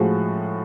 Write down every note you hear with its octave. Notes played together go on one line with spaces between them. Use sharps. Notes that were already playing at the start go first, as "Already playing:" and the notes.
Already playing: A2 F3 G#3 F#4